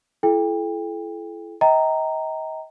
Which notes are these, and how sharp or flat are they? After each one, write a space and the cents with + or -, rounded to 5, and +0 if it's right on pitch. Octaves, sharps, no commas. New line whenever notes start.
E4 +35 A4 -45 G5 +30
D#5 +35 G5 -20 A#5 -10